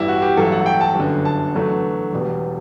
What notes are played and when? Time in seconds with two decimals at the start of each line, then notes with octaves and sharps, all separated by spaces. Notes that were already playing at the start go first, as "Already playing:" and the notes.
Already playing: A1 G2 E3 G3 E4 G4
0.08 F#4
0.22 G4
0.37 A1 G2 F#3 A3 A4
0.52 F#5
0.66 G5
0.81 A5
0.95 G1 F#2 D3
1.25 A5
1.54 E2 D3 F#3 A3
2.13 E1 E2 B2 G3